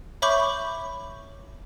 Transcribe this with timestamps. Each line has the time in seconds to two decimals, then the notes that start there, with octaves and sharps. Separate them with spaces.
0.22 C#5 E5 B5 C#6 D6 G6